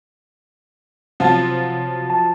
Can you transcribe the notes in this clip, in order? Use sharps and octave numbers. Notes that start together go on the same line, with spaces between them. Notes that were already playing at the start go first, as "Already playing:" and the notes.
C3 F3 F#3 F4 A5 A6
A5